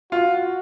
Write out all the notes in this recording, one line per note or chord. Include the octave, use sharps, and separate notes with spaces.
F4 F#4